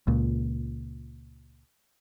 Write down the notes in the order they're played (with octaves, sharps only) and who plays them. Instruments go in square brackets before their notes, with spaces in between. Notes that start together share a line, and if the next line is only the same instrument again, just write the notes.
[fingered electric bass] C#2 A#2